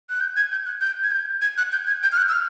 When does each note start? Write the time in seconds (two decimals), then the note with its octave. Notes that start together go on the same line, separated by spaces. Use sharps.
0.10 F#6
0.21 G6
0.36 G#6
0.52 G6
0.66 F#6
0.81 G6
1.03 G#6
1.12 G6
1.42 G#6
1.58 F#6
1.72 G6
1.87 G#6
2.03 G6
2.12 F6
2.17 F#6
2.29 E6
2.32 F6